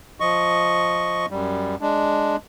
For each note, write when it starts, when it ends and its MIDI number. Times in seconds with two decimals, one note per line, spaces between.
0.20 1.26 53
0.20 1.26 75
0.20 1.26 85
1.31 1.75 42
1.31 1.75 55
1.81 2.36 56
1.81 2.36 62